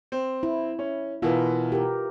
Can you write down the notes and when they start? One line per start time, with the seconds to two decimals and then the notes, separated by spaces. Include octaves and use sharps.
0.12 C4
0.43 E4
0.79 C#4
1.22 B2 E3 F4 A#4 B4
1.72 G4 A#4